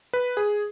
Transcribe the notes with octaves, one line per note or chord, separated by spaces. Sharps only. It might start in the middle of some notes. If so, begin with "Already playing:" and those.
B4
G#4